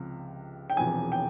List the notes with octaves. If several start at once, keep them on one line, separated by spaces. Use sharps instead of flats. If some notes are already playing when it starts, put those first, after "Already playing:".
Already playing: C#2 C3 F3
G5
E1 E2 C3 F3 G#5
G5